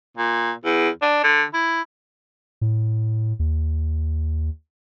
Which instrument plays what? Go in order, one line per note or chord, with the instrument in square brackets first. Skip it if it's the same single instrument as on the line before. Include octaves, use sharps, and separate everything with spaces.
[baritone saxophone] A#2
E2
D4
D3
E4
[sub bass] A2
D#2